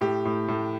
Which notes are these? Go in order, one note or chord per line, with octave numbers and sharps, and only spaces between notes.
A2 G4
A2
A2